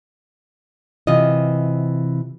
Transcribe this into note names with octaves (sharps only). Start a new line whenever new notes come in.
C3 E3 F4 D#5